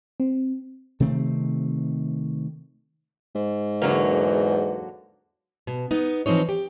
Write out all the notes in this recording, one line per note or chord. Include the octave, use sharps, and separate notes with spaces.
C4
C3 D#3 A3 C4
G#2
E2 D3 F#3 A#3
B2
B3 D#4
E3 F3 C4 D#4 C#5
G4